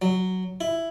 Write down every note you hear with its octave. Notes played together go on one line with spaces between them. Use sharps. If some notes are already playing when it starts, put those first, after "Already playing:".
F#3
E4